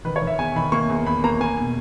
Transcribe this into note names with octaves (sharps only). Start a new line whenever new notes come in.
D#3 B4
C#5
D#3
E5
E2 G#5
D#3 B5
A#3 C#6
E2
E2 B5
A#3 A#5
A#3 G#5
B2